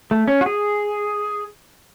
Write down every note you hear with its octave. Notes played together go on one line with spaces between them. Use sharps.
A3
C#4
F#4
G#4